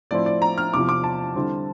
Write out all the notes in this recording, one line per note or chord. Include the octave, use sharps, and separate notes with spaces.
A2 F3 C4 E4 D5
D5
A#5
F6
E2 C3 F3 D6
D6
A5
D3 G3 C4 E4